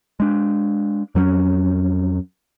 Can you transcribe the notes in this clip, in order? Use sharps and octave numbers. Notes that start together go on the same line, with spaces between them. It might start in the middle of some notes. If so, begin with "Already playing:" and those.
G#3 D4
F2 F#3 A#3 C#4